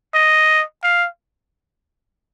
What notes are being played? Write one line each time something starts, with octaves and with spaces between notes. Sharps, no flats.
D#5
F5